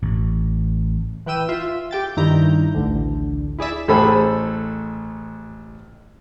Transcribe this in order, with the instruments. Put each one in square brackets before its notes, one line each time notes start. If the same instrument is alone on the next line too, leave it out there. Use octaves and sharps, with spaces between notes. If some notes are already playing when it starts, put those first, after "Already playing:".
[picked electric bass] A1
[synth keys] E3 B4 G5 E6 D#7
F4 E5
G4 G5 A6
G2 D#3 E4 A#5 G6
A1 D2 D3
E4 G#4 D5 E5
[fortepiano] A1 G#4 A4 C5 B5